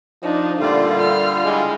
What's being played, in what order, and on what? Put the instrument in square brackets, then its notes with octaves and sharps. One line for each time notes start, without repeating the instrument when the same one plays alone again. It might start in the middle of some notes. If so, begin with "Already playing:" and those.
[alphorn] F3 [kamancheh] D4 D#4
[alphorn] A#2 [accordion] D3 G3 F4 [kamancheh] A3 D5
[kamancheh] F6
[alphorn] G#3 [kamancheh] E4